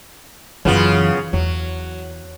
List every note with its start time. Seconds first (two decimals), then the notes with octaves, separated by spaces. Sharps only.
0.65 F#2 C#3 E3 B3 F4
1.33 E2 F#3